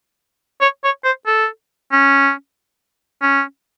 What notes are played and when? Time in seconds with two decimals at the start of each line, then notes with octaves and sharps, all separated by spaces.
0.61 C#5
0.84 C#5
1.05 C5
1.27 A4
1.92 C#4
3.22 C#4